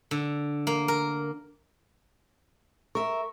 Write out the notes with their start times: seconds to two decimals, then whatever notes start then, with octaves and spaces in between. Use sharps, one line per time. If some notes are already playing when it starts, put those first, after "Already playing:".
0.11 D3
0.67 A#3
0.88 A#4
2.95 A#4 E5 C#6